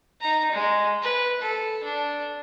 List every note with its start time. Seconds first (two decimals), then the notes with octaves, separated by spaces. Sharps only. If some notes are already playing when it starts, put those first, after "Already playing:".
0.21 D#4 A#5
0.51 G#3
1.02 B4
1.41 A4
1.84 D4